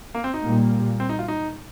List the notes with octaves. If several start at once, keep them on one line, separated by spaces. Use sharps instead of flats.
A#3
C4
D#4
A#2 G3 A#3
C4
D#4
F4
D#4